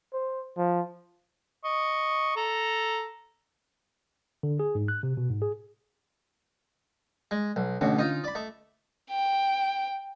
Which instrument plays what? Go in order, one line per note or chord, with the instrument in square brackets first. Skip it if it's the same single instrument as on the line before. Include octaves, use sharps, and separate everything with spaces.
[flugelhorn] C5
F3
[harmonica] D#5 C#6
A4 A#5
[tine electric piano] D3
G#4
G#2
F#6
C3
B2
G#2
G#4
[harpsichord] G#3
B1
[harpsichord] A1 B2 [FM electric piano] D3 C#4
[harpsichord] D#4 F4
D5 B5
[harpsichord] A3 [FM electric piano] D#5
[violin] G5